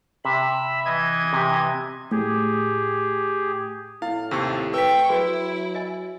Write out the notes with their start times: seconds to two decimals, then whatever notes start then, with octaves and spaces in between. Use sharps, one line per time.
0.25 C3 E5 B5
0.85 E3 D#5 G#6
1.33 C3 G4
2.12 A2 G4 G#4
4.02 A2 E4 F5
4.31 D#2 C3 C#6 E6
4.74 B4 G5 C#6 E6 B6
5.09 F#3 E4 F#4 G#4 B4
5.75 D#5 G#5